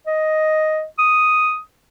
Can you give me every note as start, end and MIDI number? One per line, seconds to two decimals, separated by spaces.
0.07 0.84 75
0.99 1.59 87